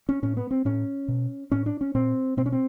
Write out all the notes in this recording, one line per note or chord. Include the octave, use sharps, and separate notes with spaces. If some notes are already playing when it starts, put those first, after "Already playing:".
C#4
A2 C#4
B3
C4
A2 C#4
B2
A2 C#4
D4
C#4
A#2 C4
B2 C4
C#4
C4